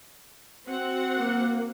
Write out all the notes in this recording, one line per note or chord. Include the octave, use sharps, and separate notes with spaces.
C4 F#4 F#5
A#3